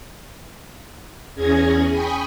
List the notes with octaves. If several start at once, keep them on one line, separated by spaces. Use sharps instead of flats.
E2 C#4 G#4 G#6 A#6
G5 G#5 B5 C#6 D#6